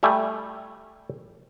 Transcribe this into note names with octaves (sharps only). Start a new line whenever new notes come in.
G3 A3 G4 E5 G#5